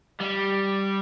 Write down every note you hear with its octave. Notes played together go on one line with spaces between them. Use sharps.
G3